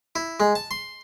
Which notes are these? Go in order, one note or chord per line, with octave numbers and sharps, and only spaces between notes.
E4
G#3
A5
C6